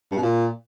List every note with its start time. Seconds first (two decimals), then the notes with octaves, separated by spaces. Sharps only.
0.11 G2
0.17 B2
0.22 A#2